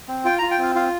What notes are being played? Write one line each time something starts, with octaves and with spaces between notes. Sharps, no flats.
C4
F4 G5
A#5
F4
G5
C4 F5
F4 F5